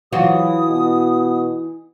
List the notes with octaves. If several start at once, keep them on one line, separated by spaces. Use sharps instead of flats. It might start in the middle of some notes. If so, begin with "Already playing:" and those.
E3 F#3 F4 F#4 D#6
B2